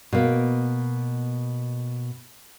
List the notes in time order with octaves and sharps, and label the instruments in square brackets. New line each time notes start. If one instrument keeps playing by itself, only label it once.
[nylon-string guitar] B2 A#3